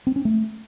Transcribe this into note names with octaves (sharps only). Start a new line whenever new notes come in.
C4
C#4
A3